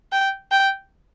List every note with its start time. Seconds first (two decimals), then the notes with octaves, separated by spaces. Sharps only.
0.12 G5
0.51 G5